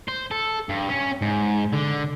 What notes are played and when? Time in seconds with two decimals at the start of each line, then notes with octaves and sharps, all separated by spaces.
0.08 C5
0.31 A4
0.69 G2
0.89 C#4
1.22 G#2
1.73 D3